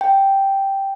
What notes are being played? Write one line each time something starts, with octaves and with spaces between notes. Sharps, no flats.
G5